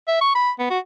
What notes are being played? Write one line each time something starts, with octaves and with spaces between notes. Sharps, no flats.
E5
C#6
B5
B3
F#4